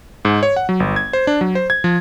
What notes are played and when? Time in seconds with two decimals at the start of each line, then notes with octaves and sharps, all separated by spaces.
0.25 G#2
0.43 C#5
0.56 F#5
0.69 F#3
0.80 G1
0.96 G#6
1.13 C5
1.27 D4
1.41 F#3
1.55 C5
1.70 G#6
1.84 F3